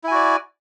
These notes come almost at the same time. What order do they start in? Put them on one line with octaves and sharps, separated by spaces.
E4 G#5 F#4 D5